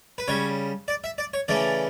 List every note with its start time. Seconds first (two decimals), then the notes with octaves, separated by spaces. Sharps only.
0.18 B4
0.28 C#3 G3 C#5
0.88 D5
1.04 E5
1.18 D5
1.34 C#5
1.48 C#3 E3 A3 D5